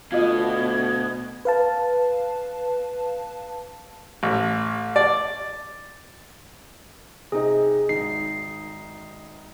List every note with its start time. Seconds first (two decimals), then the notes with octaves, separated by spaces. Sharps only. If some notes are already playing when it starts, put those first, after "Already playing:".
0.12 D2 B2 F4 D#5 D6 G#6
1.45 B4 F5 A5
4.23 A1
4.96 D5
7.32 C3 D#4 G#4 D#5
7.89 G#1 D#4 C7